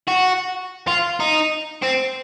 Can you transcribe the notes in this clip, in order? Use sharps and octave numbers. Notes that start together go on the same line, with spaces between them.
F#4
F4
D#4
C4